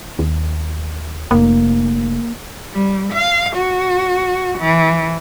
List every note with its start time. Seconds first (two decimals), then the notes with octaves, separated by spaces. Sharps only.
0.19 D#2
1.31 F1 A#3
2.73 G3
3.13 F5
3.57 F#4
4.58 E3